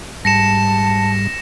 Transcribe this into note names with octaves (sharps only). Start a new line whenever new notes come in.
G#2 G3 A5 A#6 C#7 E7